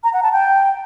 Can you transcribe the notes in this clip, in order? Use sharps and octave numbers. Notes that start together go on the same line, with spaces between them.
A#5
F#5
A5
G5